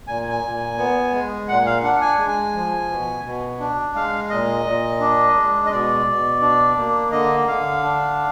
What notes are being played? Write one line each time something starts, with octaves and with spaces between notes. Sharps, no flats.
A#2 G#5
G#5
A#2
B3
G#3
A#2 F#5
F5
D4 F#5
G#5
G#3
G#5
F3
B2
B2
D4
G#3 F5
A#2 D#5
A#2
D4
G#3
D#5
B2 D5
B2
D4
A#3
D3 D#5
D3 F5
D4